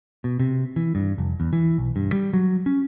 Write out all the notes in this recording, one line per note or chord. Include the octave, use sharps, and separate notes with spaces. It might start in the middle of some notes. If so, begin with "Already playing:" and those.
B2
C3
E3
G2
F1
E2
E3
B1
G2
G3
F#3
C#4